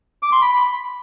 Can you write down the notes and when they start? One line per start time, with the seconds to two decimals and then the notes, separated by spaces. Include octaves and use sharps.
0.23 D6
0.32 C6
0.42 B5